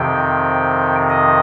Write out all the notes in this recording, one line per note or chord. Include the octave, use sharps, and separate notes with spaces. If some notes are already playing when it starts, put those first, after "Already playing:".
Already playing: F2 C3 D#3 G5
D#5